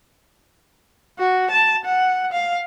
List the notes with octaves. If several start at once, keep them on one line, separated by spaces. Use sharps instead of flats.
F#4
A5
F#5
F5